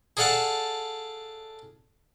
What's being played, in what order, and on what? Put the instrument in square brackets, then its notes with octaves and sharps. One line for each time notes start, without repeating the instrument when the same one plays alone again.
[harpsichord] G#4 A4 D5 F5 F#5 A5